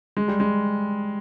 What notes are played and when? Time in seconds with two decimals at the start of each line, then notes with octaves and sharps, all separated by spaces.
0.17 G#3
0.28 G3
0.40 G#3